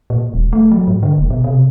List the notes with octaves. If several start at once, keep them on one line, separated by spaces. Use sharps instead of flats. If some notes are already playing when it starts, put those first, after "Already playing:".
A#2
D#1
A3
F#3
G#2
D3
F1
B2
C3